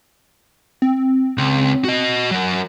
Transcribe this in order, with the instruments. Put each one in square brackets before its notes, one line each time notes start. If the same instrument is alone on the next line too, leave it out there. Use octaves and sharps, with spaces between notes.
[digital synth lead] C4
[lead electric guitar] C#2
F#4 D#5
F#3 A#4